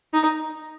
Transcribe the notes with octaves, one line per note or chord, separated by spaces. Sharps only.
D#4